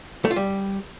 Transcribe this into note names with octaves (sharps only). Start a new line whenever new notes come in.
A3
F4
G3